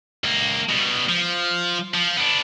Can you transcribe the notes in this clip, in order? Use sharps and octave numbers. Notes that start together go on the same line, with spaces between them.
C#2 A#3
B2 G3
F3
F3
B3 D4